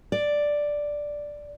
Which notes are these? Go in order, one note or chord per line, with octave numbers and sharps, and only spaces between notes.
D5